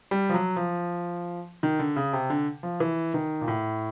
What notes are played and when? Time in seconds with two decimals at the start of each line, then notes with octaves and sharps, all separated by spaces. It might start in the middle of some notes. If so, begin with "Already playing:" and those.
0.11 G3
0.29 F3
0.34 F#3
0.56 F3
1.63 D#3
1.79 D3
1.96 C#3
2.13 C3
2.30 D3
2.63 F3
2.80 E3
3.14 D#3
3.41 A#2
3.48 A2